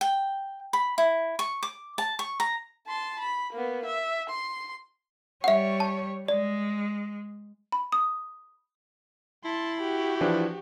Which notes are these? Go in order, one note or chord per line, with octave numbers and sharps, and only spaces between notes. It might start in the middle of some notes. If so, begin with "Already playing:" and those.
G5
B5
E4
C#6
D6
A5
C#6
A#5
A5 C6
B5
A#3 B3
E5
C6
G3 C#5 E5 F#5
A5
G#3 D5
B5
D#6
E4 A5 C6
F#4 G4
E3 F3 D4